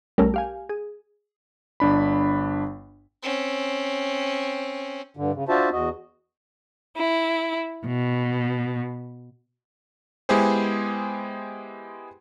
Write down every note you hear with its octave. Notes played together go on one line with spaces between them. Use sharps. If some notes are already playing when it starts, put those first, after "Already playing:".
B1 G3 A3 C#4 A#4
G4 F5 G#5
G#4
G1 D4 B5
C4 C#4
G2 D3
C#3
D4 F4 F#4 C5 E5 A5
E2 F#4 D#5
E4
B2
G#3 B3 E4 G4 G#4 C5